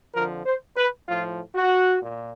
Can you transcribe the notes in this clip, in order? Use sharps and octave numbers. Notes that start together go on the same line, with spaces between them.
F2 D3 F3 A#4
C5
B4
A2 F3 F4
F#4
A#2